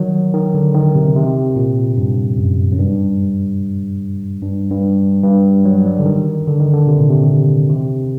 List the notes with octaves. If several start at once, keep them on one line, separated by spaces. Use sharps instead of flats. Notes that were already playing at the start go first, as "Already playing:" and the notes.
Already playing: D#3 F#3
D#3
D3
D#3
C3
C3
A#2
G2
F#2
F#2
G2
G2
G2
G2
F#3
G3
D3
D#3
D3
D#3
D3
C3
A#2
C3
C3